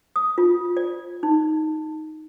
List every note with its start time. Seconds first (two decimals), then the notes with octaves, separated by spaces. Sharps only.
0.16 D#6
0.38 F4
0.77 D5
1.23 D#4